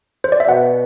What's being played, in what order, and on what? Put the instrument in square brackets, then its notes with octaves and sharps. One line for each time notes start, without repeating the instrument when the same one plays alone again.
[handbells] C5
D5
E5
[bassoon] B2 [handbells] F#5